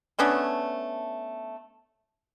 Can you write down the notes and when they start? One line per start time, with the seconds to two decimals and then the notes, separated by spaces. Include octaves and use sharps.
0.19 A3 B3 C#4 D4